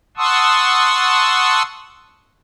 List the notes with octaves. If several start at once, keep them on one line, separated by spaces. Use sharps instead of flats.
F#5 A5 C6 C#6 D#6 E6